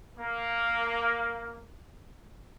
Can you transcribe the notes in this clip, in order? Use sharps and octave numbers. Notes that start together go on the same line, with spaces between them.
A#3